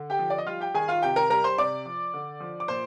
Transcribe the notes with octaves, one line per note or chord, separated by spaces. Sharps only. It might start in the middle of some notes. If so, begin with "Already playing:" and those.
Already playing: D3
G4 G5
F3
D5
D#5
G3 F4 F5
G4 G5
D#3 G#4 G#5
F4 F5
C3 G4 G5
A#4 A#5
G3 A#4 A#5
C5 C6
C3 D5 D6
F3
D3
F3
D6
A#2 C5 C6